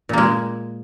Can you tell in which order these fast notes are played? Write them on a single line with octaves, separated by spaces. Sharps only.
A#2 A#3 G#3